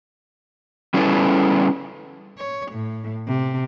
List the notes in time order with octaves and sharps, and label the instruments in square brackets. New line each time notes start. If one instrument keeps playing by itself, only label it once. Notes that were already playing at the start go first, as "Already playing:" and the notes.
[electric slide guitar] G3 C#4 E4 G#4 A4 B4
[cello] C#5
A2
C3